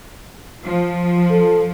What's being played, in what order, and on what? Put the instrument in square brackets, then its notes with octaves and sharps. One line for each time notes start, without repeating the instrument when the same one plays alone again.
[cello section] F3
[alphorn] A4